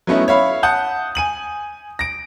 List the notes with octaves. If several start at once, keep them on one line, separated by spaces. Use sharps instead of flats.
F#3 A3 B3 C#4 D#4 E4
C#5 E5 F5 B5
F#5 A5 D#6 G6
G#5 D#7 F#7
A#6 D7